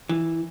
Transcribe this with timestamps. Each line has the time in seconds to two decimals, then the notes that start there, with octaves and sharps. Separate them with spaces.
0.09 E3